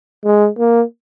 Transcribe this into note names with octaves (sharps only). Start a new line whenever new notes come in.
G#3
A#3